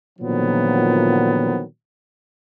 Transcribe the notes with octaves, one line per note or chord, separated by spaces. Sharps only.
A#2 D3 D#3 F3 F#3 B3